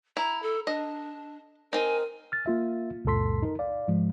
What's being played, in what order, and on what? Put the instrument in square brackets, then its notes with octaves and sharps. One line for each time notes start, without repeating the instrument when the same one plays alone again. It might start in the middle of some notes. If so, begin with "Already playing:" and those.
[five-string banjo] E4 [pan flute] A#5
[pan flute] A4
[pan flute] D4 [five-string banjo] D#5
[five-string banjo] C4 D#4 [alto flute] A#4 [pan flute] G#5
[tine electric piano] F6 A6
A#3 F4 E5
C#2 F#2 A#2 A4 C6 B6
D#4 A#4
D5 F5
G#2 F3 G#3